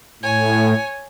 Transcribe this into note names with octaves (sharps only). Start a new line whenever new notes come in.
A2 C#5 G#5